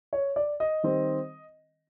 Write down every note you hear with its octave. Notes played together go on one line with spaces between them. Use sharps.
C#5
D5
D#5
D#3 G3 C4